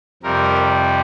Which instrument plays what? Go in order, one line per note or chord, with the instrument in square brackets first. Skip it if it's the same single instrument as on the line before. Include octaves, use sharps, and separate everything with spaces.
[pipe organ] F2 C3 G3 A#4